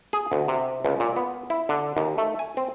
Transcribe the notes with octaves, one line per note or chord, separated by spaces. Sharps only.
G#4
D2
C3
C#2
A#2
B3
E4
D3
D#2
A3
G#5
C4